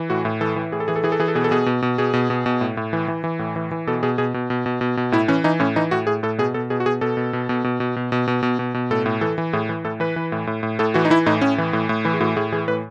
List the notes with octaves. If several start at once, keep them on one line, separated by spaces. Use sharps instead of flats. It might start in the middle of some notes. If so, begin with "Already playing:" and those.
Already playing: E3
A2 F#4
A2
E3 A4
E3
A2 G#4
A4
E3 G#4
A4
E3 G#4
A4
E3 G#4
A4
B2 G#4
A4
B2 G#4
B2
B2
B2 G#4
B2
B2
B2
A2
A2
E3
E3
E3
A2
E3
E3
B2 A4
B2 G#4
B2 G#4
B2
B2
B2
B2
B2
A2 E4
E3 C#4
E3 D#4
A2 C#4
E3 D#4
A2 F#4
A2 G#4
A2 A4
B2 G#4
B2 A4
B2 G#4
F#4
B2 G#4
B2 A4
B2
B2
B2
B2
B2
B2
B2
B2
B2
B2
B2
A2 A4
A2
E3 A4
E3
A2 G#4
E3
A2 A4
E3 B4
E3
A2
A2
A2
A2 A4
E3 F#4
D#4
E3 E4
A2 D#4
A2 C#4
E3
A2
A2
E3 E4
G#4
A2 F#4
A2 G#4
E3 G#4
A2 B4